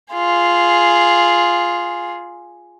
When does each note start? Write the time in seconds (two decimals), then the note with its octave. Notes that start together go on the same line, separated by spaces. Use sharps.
0.14 F4 G#4